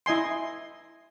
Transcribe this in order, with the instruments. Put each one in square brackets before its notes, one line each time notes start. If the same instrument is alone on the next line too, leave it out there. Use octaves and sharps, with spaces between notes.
[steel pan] E4 D#5 G#5 C6